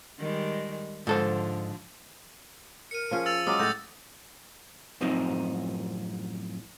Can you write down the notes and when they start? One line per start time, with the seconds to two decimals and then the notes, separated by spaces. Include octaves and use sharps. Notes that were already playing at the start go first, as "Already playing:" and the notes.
0.19 D#3 G3 G#3
1.07 G#2 D3 F3 A4 C5
2.91 A#4 C#7 D#7
3.11 F3 C#4 G#4
3.26 E6 A6 F7
3.47 F#3 G#3 C#4 D6 D#6
3.59 A2 F#4 G6 A6
5.01 F#2 A2 F3 C4 D#4